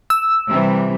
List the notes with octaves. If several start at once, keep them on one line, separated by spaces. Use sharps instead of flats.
E6
C3 E3 G3